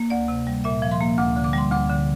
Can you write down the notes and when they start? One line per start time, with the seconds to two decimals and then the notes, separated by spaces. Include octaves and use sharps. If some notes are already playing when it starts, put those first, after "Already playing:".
Already playing: A#3
0.10 D2 D5
0.28 C3
0.47 G3
0.64 A#2 E5
0.82 F3
0.91 C6
1.00 A#3
1.18 D2 D6
1.36 D3
1.44 D6
1.53 G3 C6
1.71 D2 D6
1.89 D3